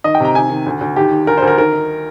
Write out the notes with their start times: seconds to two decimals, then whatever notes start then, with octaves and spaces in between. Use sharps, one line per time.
0.04 D#3 D#5
0.15 G5
0.20 C3 A#5
0.35 D#3 G#5
0.50 D#3
0.66 D2
0.81 D2
0.96 D#2 G4
1.11 D#3
1.27 D2 A#4
1.38 D2 C5
1.48 A#4
1.58 D#3 A#4
1.73 D#3